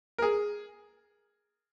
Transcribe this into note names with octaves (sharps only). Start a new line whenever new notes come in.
A#4
G#4